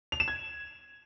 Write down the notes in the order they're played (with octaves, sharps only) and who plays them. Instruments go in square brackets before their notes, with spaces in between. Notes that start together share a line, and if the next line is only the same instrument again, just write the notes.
[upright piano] F7
E7
G#6